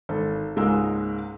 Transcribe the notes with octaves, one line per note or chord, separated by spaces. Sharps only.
G#1 A4
C#2 G#2 G#3 A#3 A#4 E6